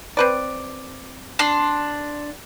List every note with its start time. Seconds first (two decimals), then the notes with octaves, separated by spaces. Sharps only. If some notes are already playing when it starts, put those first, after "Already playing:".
0.17 C4 B4 D5
1.39 D4 C6